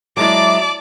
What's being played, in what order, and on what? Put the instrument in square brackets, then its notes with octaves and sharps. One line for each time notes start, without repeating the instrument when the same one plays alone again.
[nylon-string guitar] F#3 G#3 E4 [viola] D5 A5 [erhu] D6